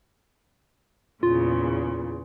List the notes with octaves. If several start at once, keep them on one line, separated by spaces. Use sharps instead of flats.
E2 A#2 C#3 F4